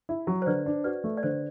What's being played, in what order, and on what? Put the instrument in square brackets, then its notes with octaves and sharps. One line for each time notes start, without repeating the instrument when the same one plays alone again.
[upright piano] E4
F#3
[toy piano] C5
[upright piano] D3 [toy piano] B4 D5
[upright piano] D4
[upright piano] F#4 [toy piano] B4 D5
[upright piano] A3
[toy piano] D5
[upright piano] D3 [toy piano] C5